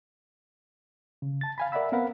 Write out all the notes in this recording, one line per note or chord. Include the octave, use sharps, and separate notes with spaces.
C#3
A5 A6
F5 G#5 B5
A#4 D5 E5 F#5 B5 E6
B3 C4 A#4 F5 F#5 B5